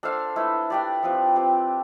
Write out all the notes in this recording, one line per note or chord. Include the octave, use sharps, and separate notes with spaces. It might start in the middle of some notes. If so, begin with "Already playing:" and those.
D4 A4 C5 F5
A3 E4 B4
D4 G4 B4 D5
F3 C4 G4 B4
C4 G4 B4